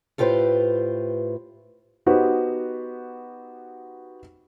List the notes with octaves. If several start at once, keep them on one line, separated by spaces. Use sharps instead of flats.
A2 F4 G4 B4 C5
B3 D#4 F#4 G4 B4 C5